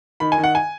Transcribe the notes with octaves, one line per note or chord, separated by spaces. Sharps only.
D#3 B5
G#5
D#3
F#5
G#5